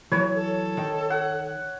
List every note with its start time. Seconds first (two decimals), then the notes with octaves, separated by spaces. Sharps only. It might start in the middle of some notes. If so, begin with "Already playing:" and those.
0.12 E3 F#3 C#5
0.35 A4
0.77 D#3
1.10 F#5